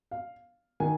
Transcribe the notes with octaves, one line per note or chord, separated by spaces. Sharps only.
F5
D#3 G#5